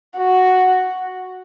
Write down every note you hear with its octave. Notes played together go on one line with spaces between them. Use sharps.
F#4